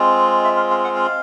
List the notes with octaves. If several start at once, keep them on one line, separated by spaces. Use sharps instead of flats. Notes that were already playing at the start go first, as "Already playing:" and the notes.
Already playing: G#3 C4 F4
E5
F5
F5
F#5
F5